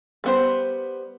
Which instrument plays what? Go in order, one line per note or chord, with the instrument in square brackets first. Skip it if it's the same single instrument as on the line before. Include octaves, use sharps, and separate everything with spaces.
[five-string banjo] G3 B3 C5